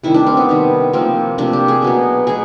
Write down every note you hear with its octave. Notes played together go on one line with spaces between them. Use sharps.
C3 D#3 G3 E4
D4
C4
B3
C3 D#3 G3
C3 F3 A#3 C4
C3 F3 A#3 D4
G4
G#4
B2 F#3 B3
B2 F#3 G#4